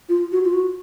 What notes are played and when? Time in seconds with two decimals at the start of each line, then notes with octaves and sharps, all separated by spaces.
0.09 F4
0.32 F#4
0.45 F4
0.53 F#4